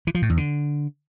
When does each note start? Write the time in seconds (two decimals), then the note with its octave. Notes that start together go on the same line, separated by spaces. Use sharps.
0.07 E3
0.15 F3
0.22 A2
0.30 E2
0.37 D3